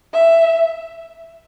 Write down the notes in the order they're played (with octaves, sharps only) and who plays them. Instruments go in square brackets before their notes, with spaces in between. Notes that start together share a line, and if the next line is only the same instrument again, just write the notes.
[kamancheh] E5